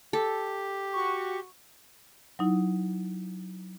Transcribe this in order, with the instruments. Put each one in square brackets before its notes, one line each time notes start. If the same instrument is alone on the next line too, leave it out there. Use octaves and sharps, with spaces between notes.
[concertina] G4 [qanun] A4
[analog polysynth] F#4 C#6
[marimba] F#3 D#4 E4